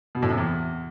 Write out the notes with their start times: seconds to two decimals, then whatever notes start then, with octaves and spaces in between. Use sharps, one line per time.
0.15 B2
0.22 A2
0.30 C3
0.38 E2